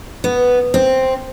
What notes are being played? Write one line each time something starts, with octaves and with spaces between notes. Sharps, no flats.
B3
C4